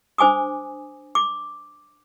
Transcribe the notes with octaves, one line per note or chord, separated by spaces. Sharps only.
D4 C5 G#5 D6 D#6
D6